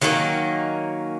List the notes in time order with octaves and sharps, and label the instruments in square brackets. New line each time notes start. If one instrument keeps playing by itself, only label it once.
[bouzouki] D#3 F#3 A#3 C#4